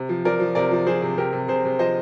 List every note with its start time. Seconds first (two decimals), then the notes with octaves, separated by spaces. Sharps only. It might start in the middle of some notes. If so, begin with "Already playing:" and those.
Already playing: C3
0.09 F3
0.25 F3 A#4 D5
0.40 F3
0.55 C3 A#4 D5
0.71 F3
0.86 F3 G#4 C5
1.02 C3
1.18 C3 G4 A#4
1.33 C3
1.48 C3 G#4 C5
1.65 C3
1.79 F3 C5 D#5